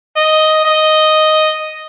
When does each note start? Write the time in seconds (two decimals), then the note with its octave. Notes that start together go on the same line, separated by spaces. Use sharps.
0.16 D#5
0.65 D#5